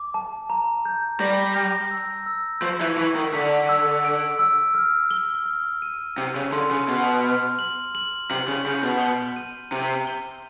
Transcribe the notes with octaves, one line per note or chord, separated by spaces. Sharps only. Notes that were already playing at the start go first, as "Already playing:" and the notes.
Already playing: D6
A5
A#5
G6
G3 A#6
A#6
E6
E6
F3 C#6
E3
E3 C#6
D#3
D3 B6
E6
D7
E6
F6
G7
F6
D#7
C3 D#7
C#3
D3 C6
C#3
B2 F6
F6
F#7
F#7
C3 F#7
C#3
C#3 G6
B2
G7
D#7
C3 D#7
G7